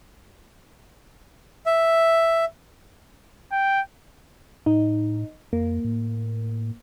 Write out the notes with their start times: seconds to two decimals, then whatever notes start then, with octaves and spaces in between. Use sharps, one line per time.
1.66 E5
3.52 G5
4.66 A2 D#4
5.53 F2 A#3
5.85 A2